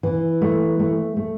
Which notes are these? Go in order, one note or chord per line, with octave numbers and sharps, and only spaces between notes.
E3
A3
A3
A3